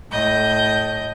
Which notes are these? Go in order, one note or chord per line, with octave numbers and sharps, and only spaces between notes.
A2 D#5 G6